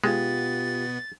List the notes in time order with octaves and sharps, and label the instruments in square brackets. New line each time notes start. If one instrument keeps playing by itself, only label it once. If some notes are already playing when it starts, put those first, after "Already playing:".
[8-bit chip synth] B2 B3 [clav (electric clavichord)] G#3 [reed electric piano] F4 G4 [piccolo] A6